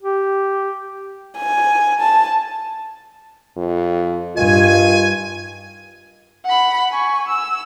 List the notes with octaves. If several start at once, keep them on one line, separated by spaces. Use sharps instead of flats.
G4
G#5
A5
F2
G2 D#3 F4 G#5
F#5 B5
G#5 C#6
E6